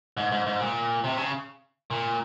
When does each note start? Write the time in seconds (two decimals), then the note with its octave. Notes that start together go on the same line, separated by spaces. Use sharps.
0.17 G#2
0.32 G#2
0.46 G#2
0.60 A#2
1.04 C3
1.17 C#3
1.90 A#2